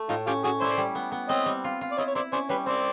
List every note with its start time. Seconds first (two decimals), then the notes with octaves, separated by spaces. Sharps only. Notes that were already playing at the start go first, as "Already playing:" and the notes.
Already playing: A3
0.09 A2 D#4 F4
0.26 C#4 F4 G4
0.44 C#4 F#4 G#4
0.60 E4 C5 D5
0.77 G3
0.95 B3
1.12 B3
1.29 C4 C#5 D#5
1.46 G3
1.64 F4
1.81 F4
1.91 D5
1.97 E4 C#5 D#5
2.08 C#5
2.15 E4 C5 D5
2.32 C#4 C5 D5
2.49 G3 B4 C#5
2.66 C4 C5 D5